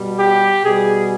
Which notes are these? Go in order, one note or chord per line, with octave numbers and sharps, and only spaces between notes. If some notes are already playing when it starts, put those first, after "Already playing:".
Already playing: B2 G3
G4
B2 G3 G#4